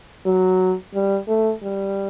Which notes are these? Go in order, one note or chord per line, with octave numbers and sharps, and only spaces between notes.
F#3
G3
A3
G3